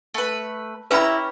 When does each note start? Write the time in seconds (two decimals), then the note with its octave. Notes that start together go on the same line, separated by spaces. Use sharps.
0.14 A3 B4
0.91 C#4 E4 G4 B4 A#5 B5